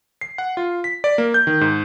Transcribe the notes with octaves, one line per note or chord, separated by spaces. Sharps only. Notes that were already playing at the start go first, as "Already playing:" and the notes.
C7
F#5
F4
B6
D5
A#3
G6
D#3
G#2